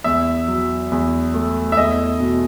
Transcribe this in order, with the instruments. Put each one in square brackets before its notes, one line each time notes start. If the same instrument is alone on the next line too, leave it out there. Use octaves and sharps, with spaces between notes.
[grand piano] E2 E5
F#3
E2
A3
E5
E2 D#5
B2